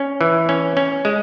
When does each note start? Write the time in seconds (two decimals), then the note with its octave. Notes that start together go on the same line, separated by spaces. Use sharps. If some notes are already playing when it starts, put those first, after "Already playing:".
Already playing: C#4
0.21 E3
0.49 C#4
0.77 C#4
1.05 G#3